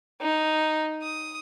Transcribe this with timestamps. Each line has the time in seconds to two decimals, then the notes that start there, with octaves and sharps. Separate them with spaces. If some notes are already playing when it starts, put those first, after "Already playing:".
0.21 D#4
1.02 D#6